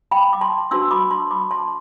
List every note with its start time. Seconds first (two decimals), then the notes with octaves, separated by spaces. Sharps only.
0.11 G5 B5
0.33 D6
0.41 A5 C6
0.71 D4 F#4 B4 C6 E6
0.91 B5 D6
1.11 A5 C6
1.31 B5 D6
1.51 A5 C6